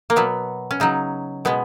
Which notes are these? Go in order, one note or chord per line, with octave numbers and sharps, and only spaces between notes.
A#3
B2 F#3 B3
C#4
C#3 F#3 D#4
B2 G#3 B3